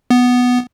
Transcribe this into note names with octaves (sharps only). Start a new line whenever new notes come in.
B3